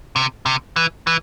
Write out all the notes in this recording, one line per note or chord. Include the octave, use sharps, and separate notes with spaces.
C3
C3
E3
E3